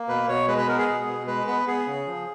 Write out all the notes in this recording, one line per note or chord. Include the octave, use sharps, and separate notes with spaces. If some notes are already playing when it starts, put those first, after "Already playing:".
Already playing: A#3
B2 B4
B2 C#5
G#3 B4
B4
B3 A#4
G#4
B2
B2
G#3 B4
B3 B4
B3 G#4
C#3
F3